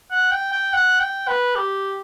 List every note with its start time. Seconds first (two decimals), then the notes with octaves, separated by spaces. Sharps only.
0.11 F#5
0.31 G5
0.52 G5
0.73 F#5
1.00 G5
1.28 B4
1.55 G4